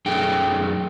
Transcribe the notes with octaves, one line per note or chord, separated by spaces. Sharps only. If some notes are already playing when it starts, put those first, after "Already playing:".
F#2 A3 D#4 G#4 G5